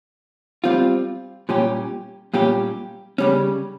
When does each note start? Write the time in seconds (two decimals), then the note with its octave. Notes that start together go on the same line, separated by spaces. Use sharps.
0.64 G3 C4 F4
1.49 A#2 G3 C#4 G4
2.34 A#2 G3 C#4 G4
3.18 C#3 G3 C#4